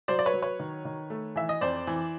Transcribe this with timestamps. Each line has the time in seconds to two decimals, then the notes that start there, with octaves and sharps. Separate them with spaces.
0.08 F#3 C5 D5
0.19 D5
0.26 B4 C#5
0.34 F#3
0.42 B4 C#5
0.60 D#3
0.85 D#3
1.10 A3
1.36 E3 E5
1.49 D#5
1.61 F2 C5 D5
1.87 E3